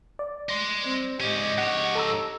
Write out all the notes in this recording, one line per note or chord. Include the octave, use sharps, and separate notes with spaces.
D5
D#5 C6
C4
G#2 C#4 G4 D#5
G#2 C#5 F#5
A4 A#5 E6